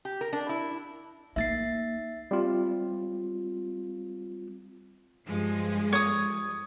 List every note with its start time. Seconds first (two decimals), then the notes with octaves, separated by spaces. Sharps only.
0.05 G4
0.21 A#4
0.33 D4
0.49 E4
1.36 A#3 D#4 E5 A6 C7
2.31 G3 C4 F4
5.27 G2 F3 G#3
5.93 C#5 D#6